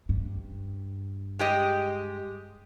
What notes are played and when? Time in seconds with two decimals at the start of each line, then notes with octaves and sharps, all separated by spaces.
0.09 G2
1.39 G#3 G4 D#5